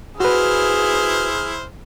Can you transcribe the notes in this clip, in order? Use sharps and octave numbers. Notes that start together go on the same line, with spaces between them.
E4 F#4 G#4 B4 C5 F6